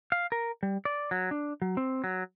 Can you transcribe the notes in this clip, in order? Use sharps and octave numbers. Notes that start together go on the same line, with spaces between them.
F5
A#4
G3
D5
F#3
D4
F#3
C4
F#3